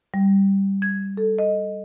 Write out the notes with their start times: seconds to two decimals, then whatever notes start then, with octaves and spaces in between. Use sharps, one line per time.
0.14 G3
0.82 G#6
1.17 A4
1.39 D#5